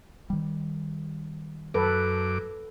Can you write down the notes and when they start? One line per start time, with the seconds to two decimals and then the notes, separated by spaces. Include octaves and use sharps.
0.30 D#3 G3
1.74 F#2 A4 B4 D6